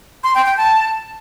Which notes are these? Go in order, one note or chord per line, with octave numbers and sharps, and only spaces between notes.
C6
G5
G5
A5